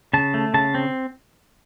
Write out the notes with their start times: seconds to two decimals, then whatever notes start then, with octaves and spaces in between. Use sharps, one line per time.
0.13 C#3 A5
0.34 A3
0.54 C#3 A5
0.75 C4